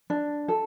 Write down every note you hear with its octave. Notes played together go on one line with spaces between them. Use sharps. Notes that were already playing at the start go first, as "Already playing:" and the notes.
D4
A4